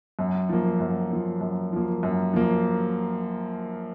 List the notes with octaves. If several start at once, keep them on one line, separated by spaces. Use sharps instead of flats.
F#2
F3 A#3
F#2
F3 A#3
F#2
F3 A#3
F#2
F3 A#3